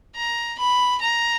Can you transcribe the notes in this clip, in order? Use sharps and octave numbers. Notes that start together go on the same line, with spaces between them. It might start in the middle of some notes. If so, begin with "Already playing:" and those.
A#5
B5
A#5